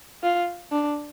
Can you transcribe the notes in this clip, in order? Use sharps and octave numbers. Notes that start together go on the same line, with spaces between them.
F4
D4